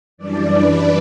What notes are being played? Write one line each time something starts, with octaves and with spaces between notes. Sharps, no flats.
F#2 E3 G3 D4 D5
B4